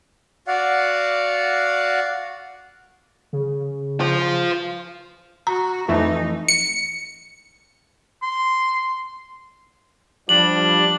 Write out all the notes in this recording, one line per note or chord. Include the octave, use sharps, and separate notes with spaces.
F#4 D5 F5 F#5
C#3
F4 C5
F#4 A#5
F2 E3 A3 D#4
C#7
C6
F3 G3 D4 F#7